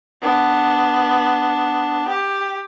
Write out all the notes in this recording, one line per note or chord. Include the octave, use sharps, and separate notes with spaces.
B3 D4
G4